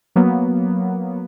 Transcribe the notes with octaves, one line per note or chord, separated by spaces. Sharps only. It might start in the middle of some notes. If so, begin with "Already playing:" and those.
F#3 A#3 B3